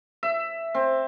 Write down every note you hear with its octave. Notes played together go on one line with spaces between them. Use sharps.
E5
C4